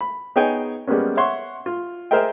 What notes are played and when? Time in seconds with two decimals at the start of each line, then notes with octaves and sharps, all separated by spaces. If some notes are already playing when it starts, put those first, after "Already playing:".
0.01 B5
0.36 B3 D#4 G#4 C#5 G5 G#5
0.87 G3 G#3 A#3 B3 C#4
1.17 C#5 E5 F#5 C6 C#6
1.66 F4
2.11 G#4 A#4 C5 D#5 E5 G5